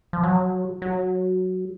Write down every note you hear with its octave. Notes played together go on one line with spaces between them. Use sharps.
F3
F#3
F#3